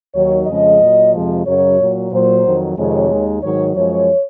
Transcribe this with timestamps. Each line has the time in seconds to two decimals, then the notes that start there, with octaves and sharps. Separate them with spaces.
0.14 D#2 D#3 F#3 C#5
0.47 F2 C#3 F3 G#3 D#5
0.80 A#2 F#3
1.13 F2 C3 F3 G#3
1.46 F#2 C#3 F#3 C#5
1.78 A#2 F#3
2.11 A#2 F#3 C5
2.44 F2 D#3 F#3
2.77 F2 C3 D#3 G#3 C#5
3.10 D#2 D#3 G#3
3.43 G#2 D#3 F#3 C#5
3.76 F#2 F3 G#3 C#5